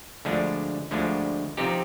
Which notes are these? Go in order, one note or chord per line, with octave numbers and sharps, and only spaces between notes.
D2 D3 F3 G#3 D4
D2 D3 F3 G#3 D4
C3 F3 C4 D#4 G4